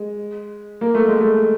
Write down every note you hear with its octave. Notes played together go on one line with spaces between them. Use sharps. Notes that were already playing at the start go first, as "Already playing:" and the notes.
Already playing: G#3
A#3
A3
G#3
A3